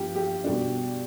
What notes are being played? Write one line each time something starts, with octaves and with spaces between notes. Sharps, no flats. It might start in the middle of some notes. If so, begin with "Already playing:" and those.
Already playing: G2 F3 B3 F4 G4
G4
B2 G3 D4